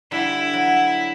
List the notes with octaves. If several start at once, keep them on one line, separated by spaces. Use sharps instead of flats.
D3 G3 E4
F#3